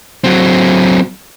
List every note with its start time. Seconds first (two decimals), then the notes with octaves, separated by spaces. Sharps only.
0.24 F#3 C4